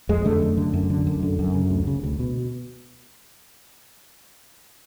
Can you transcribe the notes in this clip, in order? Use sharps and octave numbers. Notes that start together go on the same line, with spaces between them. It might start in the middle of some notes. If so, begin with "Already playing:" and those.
F2 G#3
D3 A3
F#2
D3
F#2
D3
F#2
D3
F#2
C#3
D2
C#3
D2
B2